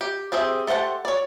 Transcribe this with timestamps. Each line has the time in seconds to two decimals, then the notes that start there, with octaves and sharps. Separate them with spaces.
0.01 G4
0.32 C4 G4 G#4 C5 E5
0.67 A3 G4 C5 F#5 A5
1.05 C#5 D5